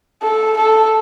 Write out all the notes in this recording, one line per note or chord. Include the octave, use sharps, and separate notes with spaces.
A4
A4